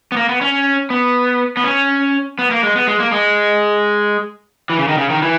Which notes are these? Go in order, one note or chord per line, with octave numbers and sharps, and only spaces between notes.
B3
A#3
B3
C#4
B3
B3
C#4
B3
A#3
G#3
B3
G#3
A#3
G#3
E3
C#3
D#3
C#3
D#3
E3